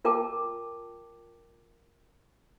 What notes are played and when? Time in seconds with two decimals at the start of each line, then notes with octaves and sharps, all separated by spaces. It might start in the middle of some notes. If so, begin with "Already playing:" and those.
0.05 F4 A#4 G5 A5 D6